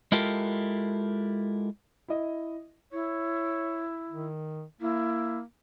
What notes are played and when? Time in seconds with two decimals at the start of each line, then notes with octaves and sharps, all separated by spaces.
0.12 G#3 E4 F4 G4 A4 A#4
2.08 E4 D#5
2.93 E4 C#5
4.09 D#3
4.81 A#3 E4